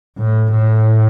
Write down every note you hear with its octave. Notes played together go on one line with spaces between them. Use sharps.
A2
A2